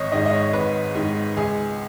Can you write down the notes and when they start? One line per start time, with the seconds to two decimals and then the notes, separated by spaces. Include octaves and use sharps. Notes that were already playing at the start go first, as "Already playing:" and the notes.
Already playing: G#1 C#5 D#5
0.12 G#2 D#3 D#5
0.26 D#5
0.33 C#5
0.53 G#1 B4
0.95 G#2 D#3
1.37 C#2 G#4